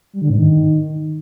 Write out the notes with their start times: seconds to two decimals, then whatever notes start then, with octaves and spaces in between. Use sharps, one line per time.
0.13 G3
0.21 D3
0.30 G#2
0.38 D#3